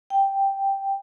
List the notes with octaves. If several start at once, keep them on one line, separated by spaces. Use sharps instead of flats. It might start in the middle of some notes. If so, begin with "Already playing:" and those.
G5